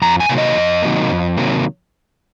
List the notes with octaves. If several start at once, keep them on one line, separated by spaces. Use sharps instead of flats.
F2 A#5
G#5
C3 D#3 F#3 A#3
D#5
F2
C3 D#3 F#3 A#3
F2
C3 D#3 F#3 A#3